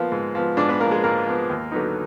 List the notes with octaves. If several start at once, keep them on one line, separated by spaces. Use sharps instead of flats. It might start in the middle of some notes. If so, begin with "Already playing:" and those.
Already playing: F3 A#3 B3
G#2
F3 B3
G#2 D4 D5
B3 B4
F3 A#3 B3 A#4
G#3 G#4
G#2 A#3 A#4
F3 B3
D#2
D3 F#3 B3 D#4